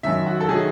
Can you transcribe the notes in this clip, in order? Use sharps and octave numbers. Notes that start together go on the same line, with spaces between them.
F#2 D#3 F#3 E5
F#4
A4
D#3 F#3 G#4